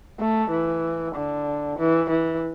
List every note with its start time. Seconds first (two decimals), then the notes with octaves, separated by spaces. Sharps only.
0.19 A3
0.50 E3
1.15 D3
1.78 E3
2.10 E3